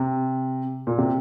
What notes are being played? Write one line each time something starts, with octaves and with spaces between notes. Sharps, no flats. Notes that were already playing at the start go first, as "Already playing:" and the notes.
Already playing: C3
A#2
C3